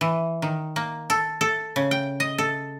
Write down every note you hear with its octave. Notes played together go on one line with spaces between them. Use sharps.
E3
D#3
A#3
A4
A4
C#3
G5
D#5
A4